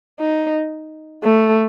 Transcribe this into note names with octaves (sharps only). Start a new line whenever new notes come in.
D#4
A3